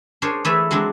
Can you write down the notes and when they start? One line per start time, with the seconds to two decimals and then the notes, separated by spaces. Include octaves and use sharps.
0.22 D4 G#4 A#4 C5 C#5
0.45 E3 A3 G#4 A4 B4
0.71 F#3 G#3 C4 D4